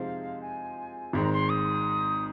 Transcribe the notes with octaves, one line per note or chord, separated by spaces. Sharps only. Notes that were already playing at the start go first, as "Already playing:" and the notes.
Already playing: C3 F3 G#3 D#4 C5 F5
G#5
G#1 G#2 D#3 C4 A#5
C6
D#6